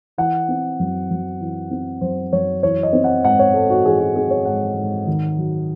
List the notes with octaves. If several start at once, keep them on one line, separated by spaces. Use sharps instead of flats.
E3 F#5
C4
F#2
F#2
E3
C4
F#2 C5
F#2 C#5
E3 C#5
D#5
C4
F#5
G#2 F#5
C#5
G#2 A4
F#4
E3 G#4
F#4
C4 G#4
C#5
G#2 F#5
G#2
D#3
F#3